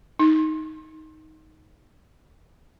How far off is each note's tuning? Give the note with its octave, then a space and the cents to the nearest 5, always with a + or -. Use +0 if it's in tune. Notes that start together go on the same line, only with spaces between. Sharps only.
D#4 +10